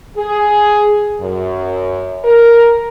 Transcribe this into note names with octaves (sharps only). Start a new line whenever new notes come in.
G#4
F#2
A#4